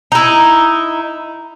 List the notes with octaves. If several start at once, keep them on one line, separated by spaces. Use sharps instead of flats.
D#4 E4